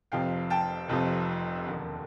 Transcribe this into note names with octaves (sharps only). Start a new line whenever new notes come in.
F1 F2 C3 F3 F5 G5
G5 A5
F1 F2 C3 F3
E1 D#2 D3